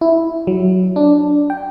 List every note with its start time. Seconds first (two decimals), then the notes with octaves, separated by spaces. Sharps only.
0.01 E4
0.47 F#3
0.96 D4
1.50 G5